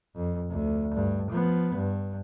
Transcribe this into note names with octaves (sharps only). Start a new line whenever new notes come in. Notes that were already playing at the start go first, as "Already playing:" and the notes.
F2
D2
G2
F3 B3
G2